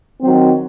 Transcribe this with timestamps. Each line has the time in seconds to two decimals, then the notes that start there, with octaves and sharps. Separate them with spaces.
0.21 D#3 F#3 C4